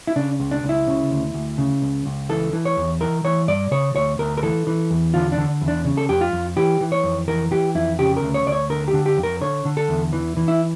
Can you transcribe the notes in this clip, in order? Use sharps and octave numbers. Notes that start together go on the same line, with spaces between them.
E4
C#3 D4
C#2
D4
C#2
E4
C#3
D2
D2
C#3
C#2
C#2
E3 A4
E3
C#5
E2
E3 A#4
E3 C#5
G2 D5
C#3 C#5
D2 C#5
D2 A#4
A#4
E3 A4
E3
E2
D3 F4
D4
D3
E2
D4
C#3
A4
F2 G4
F4
F2
E3 G4
E3
C#5
F2
E3 A#4
E3 G4
F2 E4
C#3 G4
A#4
D2
C#5
D2 D5
C#5
D3 A#4
G4
D3
G4
F2
A#4
D3 C#5
D3
A4
E2
E3
E3
E4